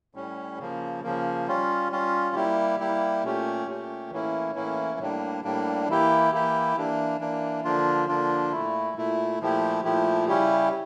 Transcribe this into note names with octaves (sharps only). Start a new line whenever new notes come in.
A2 G3 C#4
C#3 F3 A#3
C#3 F3 A#3
G3 C#4 F4
G3 C#4 F4
G3 A#3 E4 G4
G3 A#3 E4 G4
A#2 A3 C#4 G4
A#2 A3 C#4 G4
A2 E3 A#3 C#4 E4
A2 E3 A#3 C#4 E4
A2 G3 A#3 D4
A2 G3 A#3 D4
E3 A#3 E4 G4
E3 A#3 E4 G4
E3 A#3 D4
E3 A#3 D4
D3 F3 A#3 D4 F4
D3 F3 A#3 D4 F4
A#2 A3 E4
A#2 A3 E4
A#2 F3 A3 E4 G4
A#2 F3 A3 E4 G4
C#3 G3 C#4 E4 G4